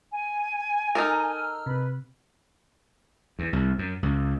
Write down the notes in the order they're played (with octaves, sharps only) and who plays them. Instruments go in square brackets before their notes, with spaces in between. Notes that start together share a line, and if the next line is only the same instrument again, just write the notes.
[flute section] G#5
[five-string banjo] D#4 A4 A#4 [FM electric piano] E6 F6
[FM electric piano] C3 [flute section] B4 B5
[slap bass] E2
C2
F#2
C#2